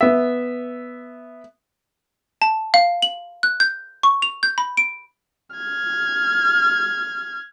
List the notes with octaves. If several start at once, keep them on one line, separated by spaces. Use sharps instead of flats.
B3 E5
A5
F5
F#7
F#6
G6
C#6
F7
G6
B5
D7
F6 G#6